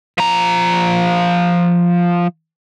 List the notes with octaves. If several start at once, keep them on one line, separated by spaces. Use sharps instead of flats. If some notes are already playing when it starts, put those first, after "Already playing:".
F3 A#5